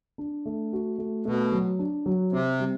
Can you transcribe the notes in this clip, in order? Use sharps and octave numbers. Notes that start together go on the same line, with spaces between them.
D4
A3
F#4
A3
B2 A3
F#3
D4
F#3
C3 C4
G3